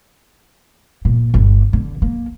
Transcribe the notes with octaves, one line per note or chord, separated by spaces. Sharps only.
A#2
G1
D3
A#3